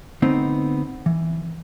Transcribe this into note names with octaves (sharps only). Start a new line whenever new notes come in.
D3 A3 B3 C4 D#4
E3